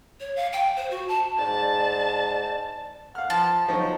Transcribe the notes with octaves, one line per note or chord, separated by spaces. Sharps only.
C#5
F5
G5
C5
F#4
A5
G#2 D5 A5
F5 F#5 F6
F3 A5
F3 F#3 D#4